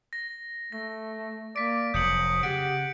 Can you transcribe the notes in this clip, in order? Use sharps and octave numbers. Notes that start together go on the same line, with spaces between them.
A#6
A3 A#6
A#3 D5 B6 D7
F1 F#3 D#6 G6 C#7 F#7
C#3 G4 F#5 D7